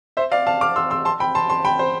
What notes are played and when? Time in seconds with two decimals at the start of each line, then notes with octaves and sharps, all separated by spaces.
0.17 C5 E5
0.32 D5 F5
0.47 F5 A5
0.61 D6 F6
0.76 C6 E6
0.90 C6 E6
1.05 A5 C6
1.20 G5 B5
1.35 A5 C6
1.49 A5 C6
1.65 G5 B5
1.79 C5